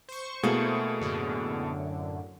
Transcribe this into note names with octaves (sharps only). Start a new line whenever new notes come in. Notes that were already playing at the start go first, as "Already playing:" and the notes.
C5 C#6
B2 A3 A#3 E4 G#4
F#2 A2 D3